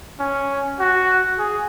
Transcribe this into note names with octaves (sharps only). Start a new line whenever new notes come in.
C#4
F#4
G#4